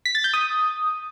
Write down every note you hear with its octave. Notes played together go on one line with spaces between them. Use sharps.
B6
A6
G6
D#6